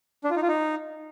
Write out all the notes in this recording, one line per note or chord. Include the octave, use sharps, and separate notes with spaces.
D4
F4
D#4
F4
D#4